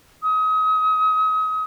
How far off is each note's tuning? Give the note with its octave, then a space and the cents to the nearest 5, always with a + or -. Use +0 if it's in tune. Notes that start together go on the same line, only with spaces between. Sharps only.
D#6 +35